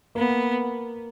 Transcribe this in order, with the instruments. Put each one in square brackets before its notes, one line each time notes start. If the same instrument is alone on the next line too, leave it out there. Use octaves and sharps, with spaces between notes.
[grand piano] A#3 [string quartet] B3